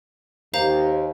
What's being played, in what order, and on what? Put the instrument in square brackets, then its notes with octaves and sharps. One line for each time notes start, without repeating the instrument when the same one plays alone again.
[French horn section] D#2 [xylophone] C5 F5 A#5